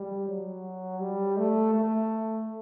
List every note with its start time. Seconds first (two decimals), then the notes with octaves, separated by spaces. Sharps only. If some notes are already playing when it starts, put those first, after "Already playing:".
Already playing: G3
0.28 F#3
1.01 G3
1.37 A3
1.73 A3